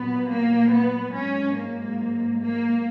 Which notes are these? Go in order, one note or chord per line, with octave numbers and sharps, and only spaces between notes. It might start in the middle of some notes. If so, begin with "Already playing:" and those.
Already playing: A#2 F#3 B3
A#3
B3
G#2 F#3 C#4
A#3
A#3